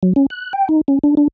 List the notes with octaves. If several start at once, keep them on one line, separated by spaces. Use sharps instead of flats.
F#3
C#4
F#6
G5
D#4
C#4
D4
D4